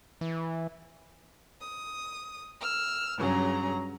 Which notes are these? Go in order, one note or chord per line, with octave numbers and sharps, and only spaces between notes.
E3
D#6
E6 F6
G2 C#3 F#3 G#4 A#5